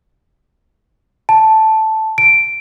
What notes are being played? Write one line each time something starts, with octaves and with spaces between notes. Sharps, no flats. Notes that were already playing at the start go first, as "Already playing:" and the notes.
A5
D7